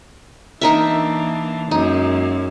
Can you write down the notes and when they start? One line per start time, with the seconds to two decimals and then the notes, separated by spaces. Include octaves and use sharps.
0.61 E3 A#3 D4 D#4 A#4 E5
1.71 F#2 G#3 A#3 D#4